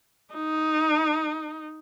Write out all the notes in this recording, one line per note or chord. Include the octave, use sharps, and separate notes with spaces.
D#4